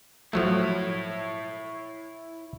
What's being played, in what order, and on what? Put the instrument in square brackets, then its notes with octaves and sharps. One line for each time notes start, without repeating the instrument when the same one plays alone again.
[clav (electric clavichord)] F3 F#3 A3 [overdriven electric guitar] E4 C#5